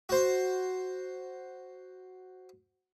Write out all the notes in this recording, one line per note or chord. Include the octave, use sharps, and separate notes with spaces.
F#4 C5